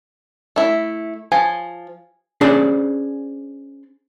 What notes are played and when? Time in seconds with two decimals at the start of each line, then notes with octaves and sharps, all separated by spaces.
0.56 A3 E4
1.32 F3 G#5
2.41 C#4 D4 G#4 C5 D5